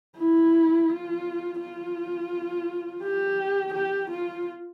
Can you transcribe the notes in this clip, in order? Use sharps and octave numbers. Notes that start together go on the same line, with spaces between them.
E4
F4
F4
G4
G4
F4